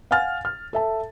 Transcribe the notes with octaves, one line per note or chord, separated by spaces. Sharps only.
F5 F#5 G#5 F6 A6
F6
A4 E5 A5